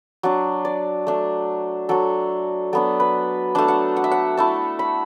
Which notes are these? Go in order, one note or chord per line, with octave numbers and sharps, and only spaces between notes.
F#3 D4 D5
D5
A3 D4
F#3 D4 A4
F#3 B3 D4 A4
B4
A3 D4 A5
F#5
F#5
E5
F#5
A3 E4 A5
B5